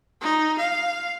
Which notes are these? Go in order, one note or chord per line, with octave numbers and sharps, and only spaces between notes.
D#4
F5